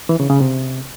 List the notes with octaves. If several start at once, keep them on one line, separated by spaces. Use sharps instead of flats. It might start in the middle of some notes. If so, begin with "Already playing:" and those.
E3
C#3
C#3
C3